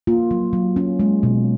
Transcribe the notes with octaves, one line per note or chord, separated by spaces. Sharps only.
A#3 F4
F#3
F#3
C#4
G#3
B2